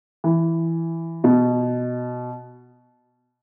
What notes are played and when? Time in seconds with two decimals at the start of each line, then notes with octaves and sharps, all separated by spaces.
0.24 E3
1.24 B2